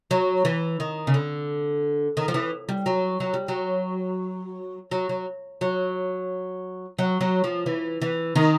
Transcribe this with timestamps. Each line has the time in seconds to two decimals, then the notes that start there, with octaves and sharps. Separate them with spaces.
0.11 F#3
0.45 E3
0.80 D#3
1.07 C#3
1.14 D3
2.17 D#3
2.28 F3
2.34 E3
2.69 G3
2.86 F#3
3.20 F#3
3.34 G3
3.48 F#3
4.91 F#3
5.09 F#3
5.61 F#3
6.99 F#3
7.21 F#3
7.44 F3
7.66 E3
8.02 E3
8.36 D#3